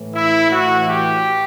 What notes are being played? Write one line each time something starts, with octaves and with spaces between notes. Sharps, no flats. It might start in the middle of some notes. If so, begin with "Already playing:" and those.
Already playing: A2 E3
E4
A2 E3 F#4
G4